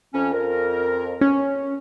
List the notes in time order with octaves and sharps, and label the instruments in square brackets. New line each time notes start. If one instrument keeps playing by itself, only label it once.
[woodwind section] F2 C#4
F2 A#4
[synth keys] C#4